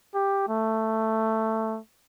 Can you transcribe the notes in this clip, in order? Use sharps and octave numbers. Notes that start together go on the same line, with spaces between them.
G4
A3